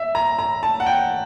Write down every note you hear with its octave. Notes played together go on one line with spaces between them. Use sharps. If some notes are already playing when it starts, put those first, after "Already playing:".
Already playing: E5
A#5
A#5
A5
F#5
G5